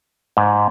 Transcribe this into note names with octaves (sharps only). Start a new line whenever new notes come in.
G#2